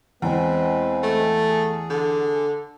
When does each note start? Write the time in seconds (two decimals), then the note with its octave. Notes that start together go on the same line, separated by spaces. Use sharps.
0.22 E2 G#3 C4 B4
1.03 A3
1.50 G#4
1.90 D3